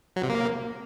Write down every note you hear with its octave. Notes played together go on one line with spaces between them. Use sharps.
F#3
C3
A#3